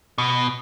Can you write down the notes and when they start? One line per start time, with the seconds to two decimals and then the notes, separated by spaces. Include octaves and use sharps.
0.18 B2